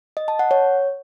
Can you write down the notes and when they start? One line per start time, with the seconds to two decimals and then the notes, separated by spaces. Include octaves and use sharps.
0.17 D#5
0.28 A5
0.39 F#5
0.51 C#5